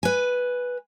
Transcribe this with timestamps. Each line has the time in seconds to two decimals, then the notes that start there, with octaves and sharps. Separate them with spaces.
0.03 B4 G#5